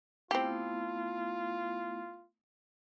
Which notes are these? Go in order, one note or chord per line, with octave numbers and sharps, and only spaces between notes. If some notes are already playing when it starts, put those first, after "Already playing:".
A3 B3 C4 E4 F4 G4